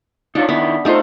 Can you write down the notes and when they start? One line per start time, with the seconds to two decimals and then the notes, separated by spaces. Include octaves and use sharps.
0.35 D4 D#4 F4 C#5
0.49 D#3 B3 E4
0.85 A3 D#4 F4 G4 C5